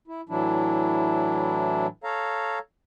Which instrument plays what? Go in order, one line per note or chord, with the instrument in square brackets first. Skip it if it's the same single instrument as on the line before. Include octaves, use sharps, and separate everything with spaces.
[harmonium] E4
A2 E3 F#3 D4 E4
A4 C#5 F5 A#5